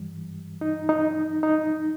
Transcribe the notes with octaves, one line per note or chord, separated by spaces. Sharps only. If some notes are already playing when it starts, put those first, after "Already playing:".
Already playing: G2 E3 G3
D#4
D#4
D#4